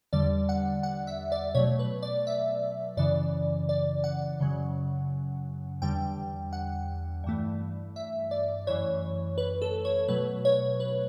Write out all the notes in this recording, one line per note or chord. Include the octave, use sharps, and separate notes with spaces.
E2 D3 G3 D5
F#5
F#5
E5
D5
B2 F#3 A3 C#5
B4
D5
E5
F#2 C#3 E3 D5
D5
F#5
F#2 C#3 F#3
E2 D3 G3 G5
F#5
G2 E3 A3
E5
D5
F#2 E3 A3 C#5
B4
A4
C#5
B2 F#3 A3 B4
C#5
B4